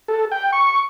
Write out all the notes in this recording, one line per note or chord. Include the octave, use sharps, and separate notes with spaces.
A4
G5
C#6